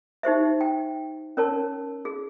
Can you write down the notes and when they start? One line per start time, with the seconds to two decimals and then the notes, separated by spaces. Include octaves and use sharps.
0.23 D#4 G4 C5 E5
0.61 G5
1.37 C#4 A#4 C#5 A5
2.05 G#4